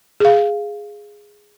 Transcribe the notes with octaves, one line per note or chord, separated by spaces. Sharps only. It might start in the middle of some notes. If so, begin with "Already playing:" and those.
G#4 F5